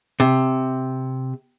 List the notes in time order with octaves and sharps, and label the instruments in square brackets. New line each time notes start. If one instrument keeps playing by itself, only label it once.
[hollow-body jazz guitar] C3